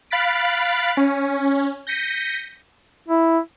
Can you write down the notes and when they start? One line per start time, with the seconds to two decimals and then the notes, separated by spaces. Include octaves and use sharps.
0.11 F5 B5 F#6 A6 B6 D7
0.97 C#4
1.87 G6 A#6 B6 C#7 D#7
3.08 E4